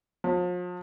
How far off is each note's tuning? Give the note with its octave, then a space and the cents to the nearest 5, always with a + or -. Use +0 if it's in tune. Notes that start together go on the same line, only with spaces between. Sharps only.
F3 +40